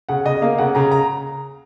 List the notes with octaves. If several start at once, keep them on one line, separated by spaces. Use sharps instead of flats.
C#3 F#5
C#3 D#5
A#3 F5
C#3 F#5
C#3 A#5
A#5